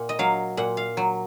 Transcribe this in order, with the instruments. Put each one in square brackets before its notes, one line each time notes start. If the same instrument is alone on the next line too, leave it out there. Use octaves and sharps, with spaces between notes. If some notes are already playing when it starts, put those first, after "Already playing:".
Already playing: [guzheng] A#2 F#5
D#5
F#3 F5
A#2 F#5
F5
F#3